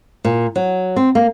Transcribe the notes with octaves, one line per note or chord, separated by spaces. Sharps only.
A#2
F#3
C4
A#3